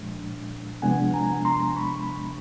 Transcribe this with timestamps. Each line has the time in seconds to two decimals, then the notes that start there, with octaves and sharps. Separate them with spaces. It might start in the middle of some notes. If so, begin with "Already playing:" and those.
Already playing: A#2 F3 G#3 D4
0.82 C3 F3 G#3 B3 D4 F#5 G#5
1.14 G#5 A#5
1.45 A#5 C6
1.76 B5 C#6